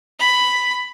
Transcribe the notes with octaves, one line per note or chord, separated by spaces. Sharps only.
B5